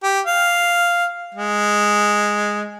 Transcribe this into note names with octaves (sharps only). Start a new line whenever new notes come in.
G4
F5
G#3